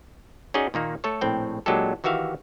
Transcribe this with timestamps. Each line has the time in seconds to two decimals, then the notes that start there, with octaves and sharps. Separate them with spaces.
0.54 C#4 D#4 F#4 G#4 D5 D#5
0.74 A#2 D#3 A#3 D#4
1.04 A3 A4 C#5
1.21 A#1 A2 C4 G5
1.66 A#2 F#3 G#3 D4 G4 A4
2.04 D#3 E3 F#4 G4 E5 F5